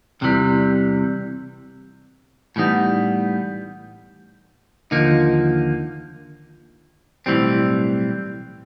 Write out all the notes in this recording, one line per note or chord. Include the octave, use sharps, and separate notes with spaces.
E2 C3 E3 G3
A2 E3 G3 B3 D#4
D#2 D3 F3 A#3 D#4
B1 A2 E3 G3 C4